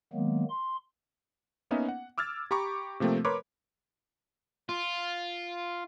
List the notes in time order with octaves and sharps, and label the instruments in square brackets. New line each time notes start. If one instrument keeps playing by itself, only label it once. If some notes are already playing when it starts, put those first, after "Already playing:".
[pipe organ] D#3 F#3 G#3 A#3 B3
C6
[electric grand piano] A#3 B3 C#4 D#4 D#5 E5
F#5
D6 E6 F6 G#6 A6
G4 A#5 B5 C#6 D6
C3 F3 A3 A#3 C4
A#4 B4 C#5 B5 C6 D6
[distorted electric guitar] F4